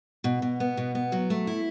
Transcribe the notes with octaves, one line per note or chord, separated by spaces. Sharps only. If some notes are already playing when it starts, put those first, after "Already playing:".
B2
B2
B3
B2
B3
F#3
A3
E4